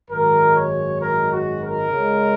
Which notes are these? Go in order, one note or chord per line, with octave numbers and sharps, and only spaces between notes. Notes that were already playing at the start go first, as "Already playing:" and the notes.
G#1 F#2 D#3 G#3 A#4
C#5
A#4
F#4
A#4
C#2 C#3 G#3